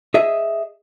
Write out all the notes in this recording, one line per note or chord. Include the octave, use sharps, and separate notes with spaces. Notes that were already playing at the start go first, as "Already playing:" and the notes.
G#4 D#5 E5